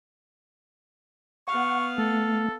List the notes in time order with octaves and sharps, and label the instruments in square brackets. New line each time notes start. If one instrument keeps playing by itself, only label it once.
[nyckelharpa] B3 F5 [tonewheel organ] F#5 [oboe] C#6
[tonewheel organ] A3 [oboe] A4